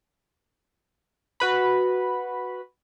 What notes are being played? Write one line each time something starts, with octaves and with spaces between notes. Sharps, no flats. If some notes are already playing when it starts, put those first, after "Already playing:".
F#4 B4 B5